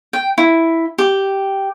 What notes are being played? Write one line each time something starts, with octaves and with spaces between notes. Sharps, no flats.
G5
E4
G4